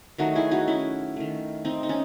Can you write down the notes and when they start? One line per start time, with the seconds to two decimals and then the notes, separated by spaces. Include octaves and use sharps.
0.18 D#3 F#3 A3 D#4 F#4
0.35 E4 G#4
0.51 D#4 F#4
0.68 C#4 E4
1.16 D#3 A3
1.65 C4 D#4
1.83 D#4
1.89 C#4